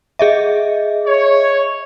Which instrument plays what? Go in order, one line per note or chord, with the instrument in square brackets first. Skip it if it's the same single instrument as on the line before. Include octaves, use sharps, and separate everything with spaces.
[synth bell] G#4 D#5 E5
[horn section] C#5